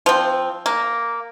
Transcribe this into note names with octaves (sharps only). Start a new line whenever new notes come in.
F3 C4
A#3